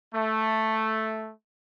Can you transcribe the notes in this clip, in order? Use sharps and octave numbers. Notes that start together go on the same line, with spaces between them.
A3